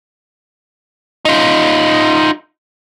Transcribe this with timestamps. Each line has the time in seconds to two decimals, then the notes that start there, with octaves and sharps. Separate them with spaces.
1.25 D#4 F4